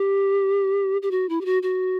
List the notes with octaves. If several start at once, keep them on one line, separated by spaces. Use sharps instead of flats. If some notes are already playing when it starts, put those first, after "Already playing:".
Already playing: G4
G4
F#4
E4
G4
F#4
F#4